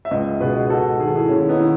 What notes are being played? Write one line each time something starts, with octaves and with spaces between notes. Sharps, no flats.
E5
C#2 B4 D#5
B2 G#4 B4
G#2 F#4 A4
D#3 G#4
A4
E4 G#4
D#2 C#4 E4
B3 D#4
D#3 E4